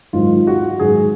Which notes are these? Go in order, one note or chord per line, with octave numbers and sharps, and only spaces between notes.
G#2 D#3 F#3 F4
F#4
G#2 D#3 F#3 G#4